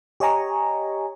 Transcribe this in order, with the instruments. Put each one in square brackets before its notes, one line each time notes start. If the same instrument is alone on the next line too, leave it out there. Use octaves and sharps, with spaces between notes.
[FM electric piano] G4 C#5 D#5 G#5 A#5 C#6